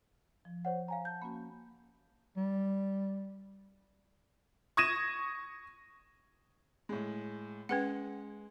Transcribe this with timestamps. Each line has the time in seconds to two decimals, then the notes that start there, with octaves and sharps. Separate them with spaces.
0.45 F3
0.65 C5 C#5 F#5
0.88 F5 G#5 A#5
1.05 A5 G6
1.22 A#3 C#4 F#4 B5
2.37 G3
4.77 C#6 D#6 G#6 A#6 D#7 E7
6.89 A2 G#3
7.69 G#3 C#4 B4 F#5